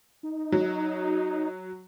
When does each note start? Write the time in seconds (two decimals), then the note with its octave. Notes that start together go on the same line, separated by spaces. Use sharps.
0.23 D#4
0.52 F#3